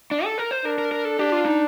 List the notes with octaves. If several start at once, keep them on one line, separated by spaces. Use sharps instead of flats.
D4
A4
A#4
C5
D4 A#4
A#4
A#4
A4
D4 G4
F4
D#4